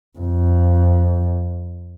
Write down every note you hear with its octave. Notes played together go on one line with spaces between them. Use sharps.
F2